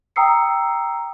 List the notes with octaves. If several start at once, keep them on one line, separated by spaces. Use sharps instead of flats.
G5 A#5 D#6 E6 C7 C#7